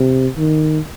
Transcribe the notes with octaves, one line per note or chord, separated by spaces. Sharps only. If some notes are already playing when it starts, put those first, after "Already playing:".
Already playing: C3
D#3